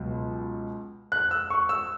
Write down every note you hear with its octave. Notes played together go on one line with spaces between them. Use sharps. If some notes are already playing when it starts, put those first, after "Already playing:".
Already playing: C#2 B2 F#3
F#6
E6
C#6
E6